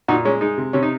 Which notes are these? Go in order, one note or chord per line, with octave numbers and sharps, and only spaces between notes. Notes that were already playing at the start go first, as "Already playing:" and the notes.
A#2 D#4 F#4
G#3 C#4
G#3 D#4
C3
C3 C#4
D#4